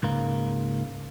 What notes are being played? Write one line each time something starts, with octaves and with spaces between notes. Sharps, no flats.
C#2 G#2 A#3